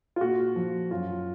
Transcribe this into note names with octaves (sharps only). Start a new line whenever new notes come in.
F4
A#2 F#4
F3
F#2 F4